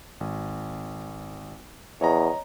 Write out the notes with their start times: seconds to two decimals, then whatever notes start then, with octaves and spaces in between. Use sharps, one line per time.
0.21 G#1
2.01 E2 C#5 D#5 A#5